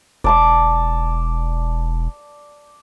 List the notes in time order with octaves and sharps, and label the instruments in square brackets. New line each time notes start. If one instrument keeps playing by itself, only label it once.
[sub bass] E1 [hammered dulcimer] D5 A5 D6